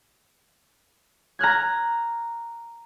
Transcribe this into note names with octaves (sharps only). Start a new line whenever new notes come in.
A#5 F6 F#6 G#6